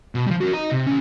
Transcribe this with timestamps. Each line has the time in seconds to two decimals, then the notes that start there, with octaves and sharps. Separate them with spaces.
0.15 B2
0.27 F3 G3
0.41 F#4 A#4
0.53 D#5 A#5
0.72 C3
0.87 E3 C#4